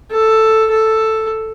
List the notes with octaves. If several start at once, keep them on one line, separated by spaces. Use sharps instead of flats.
A4
A4